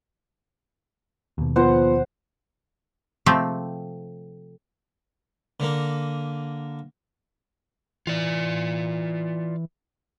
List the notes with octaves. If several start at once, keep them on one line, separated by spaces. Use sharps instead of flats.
D#2 B2
F3 B3 C5 F#5 C6
C3 F3 A3 C4 G4
D3 A#3
E3 F4 D5